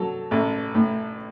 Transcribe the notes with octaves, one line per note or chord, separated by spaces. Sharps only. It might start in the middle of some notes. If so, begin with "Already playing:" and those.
Already playing: F#3 A4
A1
A2